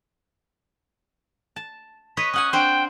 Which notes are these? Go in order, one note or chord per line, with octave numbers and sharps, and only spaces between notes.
A5
B4 C#5 D#5 B6
C#4 F#5 G#5 D#6
C4 D4 C5 G5